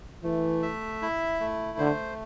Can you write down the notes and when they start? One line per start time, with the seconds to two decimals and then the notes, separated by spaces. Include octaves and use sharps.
0.24 E3 A3
0.63 E5
1.02 E4
1.40 A3
1.78 D3 C5